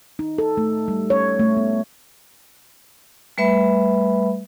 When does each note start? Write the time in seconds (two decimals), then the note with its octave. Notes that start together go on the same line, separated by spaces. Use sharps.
0.19 D#4
0.38 A4
0.57 A3
0.88 G3
1.10 C#5
1.39 A3
1.57 B3
3.38 G3 A3 B4 E5 B5